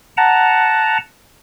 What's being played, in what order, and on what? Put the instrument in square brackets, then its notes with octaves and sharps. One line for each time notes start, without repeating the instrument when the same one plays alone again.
[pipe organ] F#5 A5 A#5